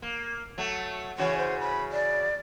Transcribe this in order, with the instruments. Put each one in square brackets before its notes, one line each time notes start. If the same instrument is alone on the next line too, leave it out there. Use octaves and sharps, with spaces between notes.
[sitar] A#3
F#3 A3
[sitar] C#3 E3 F#4 [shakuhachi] C#5
[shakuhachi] C5
B5
D5